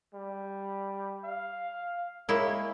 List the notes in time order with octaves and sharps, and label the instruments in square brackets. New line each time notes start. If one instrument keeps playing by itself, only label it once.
[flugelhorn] G3
F5
[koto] G#3 A#3 E4 [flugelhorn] C#5